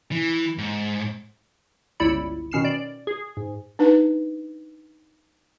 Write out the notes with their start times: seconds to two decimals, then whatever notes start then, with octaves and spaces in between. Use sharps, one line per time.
0.12 E3
0.58 G#2
2.00 G1 C#2 E4 D5 B5 C#7
2.51 B2 D#3 C#4 F6 C7 E7
2.65 D5
3.07 G#4
3.37 G#2
3.79 D4 D#4 B4